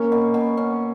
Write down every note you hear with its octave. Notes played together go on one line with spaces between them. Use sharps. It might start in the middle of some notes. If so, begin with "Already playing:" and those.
Already playing: A#3 C#4
B2
B2
C#4